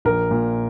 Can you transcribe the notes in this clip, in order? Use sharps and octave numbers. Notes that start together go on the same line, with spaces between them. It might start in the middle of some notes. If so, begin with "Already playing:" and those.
A#1 A#4
A#2